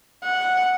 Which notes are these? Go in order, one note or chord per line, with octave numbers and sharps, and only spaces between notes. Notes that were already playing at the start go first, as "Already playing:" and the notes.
F#5